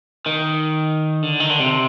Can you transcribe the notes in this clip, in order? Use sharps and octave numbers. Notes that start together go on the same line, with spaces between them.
D#3
D3
D#3
D3
C3